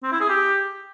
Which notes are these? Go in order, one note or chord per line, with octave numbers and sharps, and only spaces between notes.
C4
E4
G#4
G4